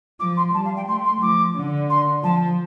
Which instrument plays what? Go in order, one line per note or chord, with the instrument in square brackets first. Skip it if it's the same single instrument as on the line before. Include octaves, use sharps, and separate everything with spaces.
[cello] F3 [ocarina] D6
[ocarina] C6
[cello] G3 [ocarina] A5
[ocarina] F5
G5
[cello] A3 [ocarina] C6
[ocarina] C6
[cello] F3 [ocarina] D6
[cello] D3
[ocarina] C6
[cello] F3 [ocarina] A5